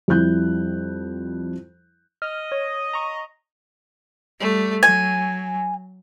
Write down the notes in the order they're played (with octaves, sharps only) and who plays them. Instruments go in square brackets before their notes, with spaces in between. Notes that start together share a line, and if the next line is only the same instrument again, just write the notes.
[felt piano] F2 G3 E4 F#6 G6
[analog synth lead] D#5 [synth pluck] F6
[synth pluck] C#5
A#5 C#6
[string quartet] G3 A3
[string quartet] F#3 [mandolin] G#5